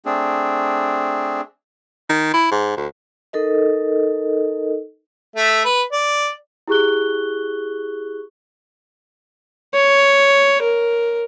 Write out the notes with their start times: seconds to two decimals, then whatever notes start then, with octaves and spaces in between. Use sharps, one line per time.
0.06 A3 C4 D4 G#4
2.09 D#3
2.34 E4
2.52 G#2
2.77 D2
3.33 D#4 A4 A#4 D#5
5.36 A3 E5
5.65 B4
5.92 D5
6.68 E4 G4 G#4 C#6 F#6 G7
9.74 C#5
10.63 A#4